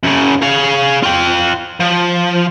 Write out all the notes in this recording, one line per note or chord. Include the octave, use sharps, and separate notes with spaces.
F#2 C#3
G#4 F5
F4 G5
F3